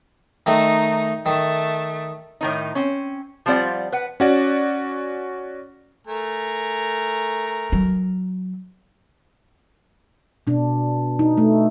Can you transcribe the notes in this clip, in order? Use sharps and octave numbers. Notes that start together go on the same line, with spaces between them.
D#3 A3 D#4
D#3 A3
A2 D#3 D#4
C4 C#4
F3 G3 C4 F4 D5 F#5
B4 F#5
C#4 F#4 D5
A3 A#4 G#5
F#3
B2 D4
D#4
A3